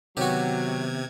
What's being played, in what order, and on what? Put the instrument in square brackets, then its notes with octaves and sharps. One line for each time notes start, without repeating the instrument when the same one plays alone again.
[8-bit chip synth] C3 G#6 [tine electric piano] D#3 B3 [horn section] F#3 [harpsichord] F#4 G4